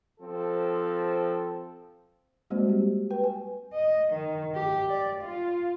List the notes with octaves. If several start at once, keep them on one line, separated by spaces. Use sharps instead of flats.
F3 C4 A4
G3 G#3 A#3 C4 F#4 C5
G4
B4 G5
G#5
D#5
D#3
G4
D5
F4